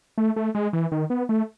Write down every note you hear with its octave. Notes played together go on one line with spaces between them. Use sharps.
A3
A3
G#3
E3
D#3
B3
A3